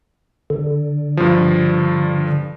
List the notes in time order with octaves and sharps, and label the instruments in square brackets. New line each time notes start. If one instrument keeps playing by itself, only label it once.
[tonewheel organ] D3
[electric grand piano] G2 F3